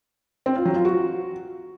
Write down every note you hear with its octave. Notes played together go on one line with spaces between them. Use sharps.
C4
F4
F#3
F4
F#4